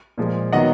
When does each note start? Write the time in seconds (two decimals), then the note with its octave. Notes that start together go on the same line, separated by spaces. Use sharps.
0.18 A#2 F3 G#3
0.53 D#3 F#3 B3 D#5 F#5